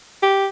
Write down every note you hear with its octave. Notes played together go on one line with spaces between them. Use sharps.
G4